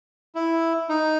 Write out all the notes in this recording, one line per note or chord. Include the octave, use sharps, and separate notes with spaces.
E4
D#4